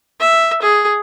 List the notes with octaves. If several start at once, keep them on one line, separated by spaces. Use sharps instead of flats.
E5
G#4